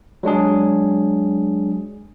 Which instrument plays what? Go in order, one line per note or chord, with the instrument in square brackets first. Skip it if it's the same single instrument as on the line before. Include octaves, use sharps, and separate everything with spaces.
[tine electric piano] F#3 G#3 D4 G#4